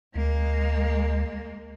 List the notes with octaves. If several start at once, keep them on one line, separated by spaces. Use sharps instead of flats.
D2 G#3 A#3